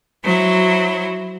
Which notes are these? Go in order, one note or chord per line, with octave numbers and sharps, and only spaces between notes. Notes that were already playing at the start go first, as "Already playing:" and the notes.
F#3 E4 C5